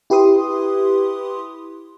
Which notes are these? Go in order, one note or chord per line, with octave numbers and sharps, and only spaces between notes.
E4 G4 B4 C6 D#6